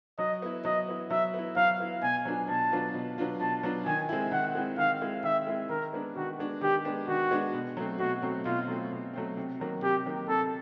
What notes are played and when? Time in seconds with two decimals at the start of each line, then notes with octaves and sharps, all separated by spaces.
0.18 F#3 D#5
0.42 B3 E4
0.65 F#3 D#5
0.88 B3 E4
1.10 F#3 E5
1.34 B3
1.39 E4
1.56 F#3 F5
1.80 B3 E4
2.02 B2 G#5
2.25 F#3 B3 D4 F4
2.48 B2 A5
2.72 F#3 B3 D4 F4
2.94 B2
3.18 F#3 B3 D4 F4
3.40 B2 A5
3.63 F#3 B3 D4 F4
3.86 D#3 G#5
4.09 G#3 C4 E4
4.32 D#3 F#5
4.55 G#3 C4 E4
4.78 D#3 F5
5.01 G#3 C4 E4
5.23 D#3 E5
5.47 G#3 C4 E4
5.69 D#3 A#4
5.93 G#3 B3 D4
6.16 D#3 F#4
6.39 G#3 B3 D4
6.61 D#3 G4
6.85 G#3 B3 D4
7.08 D#3 F#4
7.31 G#3 B3 D4
7.54 B2
7.77 F#3 A3 C4
7.99 B2 F#4
8.22 F#3 A3 C4
8.45 B2 F4
8.68 F#3 A3 C4
8.91 B2
9.13 F#3 A3 C4
9.37 C3
9.60 D#3 F#3 A#3
9.82 C3 G4
10.06 D#3 F#3 A#3
10.28 C3 A4